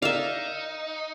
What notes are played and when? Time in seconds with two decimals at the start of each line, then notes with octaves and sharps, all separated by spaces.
0.02 D#4 A#4 D5 E5 F5